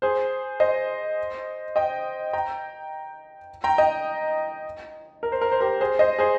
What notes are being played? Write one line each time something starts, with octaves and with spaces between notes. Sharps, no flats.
G#4 C5
C5 D#5
D#5 G5
G5 A#5
G5 A#5
D#5 G5
A#4
C5
A#4
C5
G4 A#4
G#4 C5
C5 D#5
G#4 C5